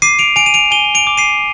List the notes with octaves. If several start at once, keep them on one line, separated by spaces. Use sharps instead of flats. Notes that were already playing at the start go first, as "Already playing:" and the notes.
D6 C7 D#7
D7 F7
G#5 D7 F7
D#7
D7 F7
G#5 D#7 G7
D7 F7
D6
C7 D#7